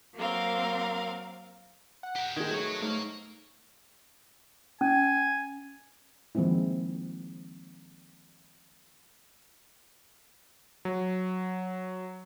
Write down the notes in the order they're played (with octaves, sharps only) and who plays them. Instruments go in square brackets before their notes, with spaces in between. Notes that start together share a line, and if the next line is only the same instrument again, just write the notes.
[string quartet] F#3 A#3 C4 A#4 F5
[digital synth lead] F#5
[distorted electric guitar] G4 A#4
[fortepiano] D#3 G#3 [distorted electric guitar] D#4 G5 [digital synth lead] G#6
[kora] F#3 A3 B3 [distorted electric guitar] F#4 C#5
[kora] G#2 C#5 [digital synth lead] A3 [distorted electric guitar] A#4 F5
[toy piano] C#4 [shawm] G#5
[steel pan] D#3 F3 G#3 A#3 C4 E4
[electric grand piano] F#3